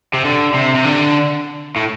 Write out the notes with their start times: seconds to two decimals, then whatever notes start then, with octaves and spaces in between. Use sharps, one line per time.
0.13 C3
0.24 D3
0.54 C3
0.75 C3
0.85 D3
1.76 A2